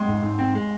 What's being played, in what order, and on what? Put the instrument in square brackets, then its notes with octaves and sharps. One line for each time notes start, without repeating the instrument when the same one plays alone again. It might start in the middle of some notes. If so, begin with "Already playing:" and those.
Already playing: [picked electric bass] G#3 [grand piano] C6
[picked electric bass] G#2
G#2
C4
G#3